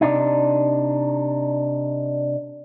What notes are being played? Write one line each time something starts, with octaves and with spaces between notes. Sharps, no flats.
C3 D4 D#4